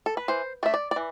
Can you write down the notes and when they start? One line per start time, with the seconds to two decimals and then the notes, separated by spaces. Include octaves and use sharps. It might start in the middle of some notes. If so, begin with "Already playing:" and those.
0.06 A4
0.17 B4
0.28 E3 C5
0.63 A3 D4 E5
0.74 D5
0.91 D5
0.96 E3